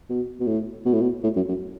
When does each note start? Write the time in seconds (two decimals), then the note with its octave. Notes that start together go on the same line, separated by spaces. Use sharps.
0.10 B2
0.40 B2
0.47 A2
0.85 B2
0.93 A2
1.01 B2
1.24 A2
1.36 F#2
1.49 F#2